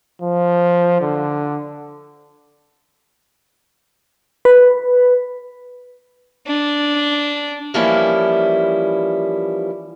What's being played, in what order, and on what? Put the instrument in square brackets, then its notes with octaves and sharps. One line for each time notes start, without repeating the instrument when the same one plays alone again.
[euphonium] F3
D3
[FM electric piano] B4
[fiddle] D4
[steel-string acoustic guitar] E3 F3 G3 A#3 C#4 E4